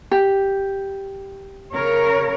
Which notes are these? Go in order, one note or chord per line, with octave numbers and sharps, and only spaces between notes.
G4
C#3 A#4 C#5